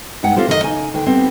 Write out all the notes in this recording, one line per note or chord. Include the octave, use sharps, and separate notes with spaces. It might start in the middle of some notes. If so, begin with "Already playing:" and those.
G2 G#3 D#4 F#5 G5
C4 F4 G4 A4 C5
F#2 D#3 A3 D#4 F4 D#5
C#3 D#4 G#5
D#2 D3 G5
G3 B3 C4